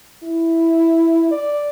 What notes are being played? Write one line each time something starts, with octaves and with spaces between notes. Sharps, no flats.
E4
D5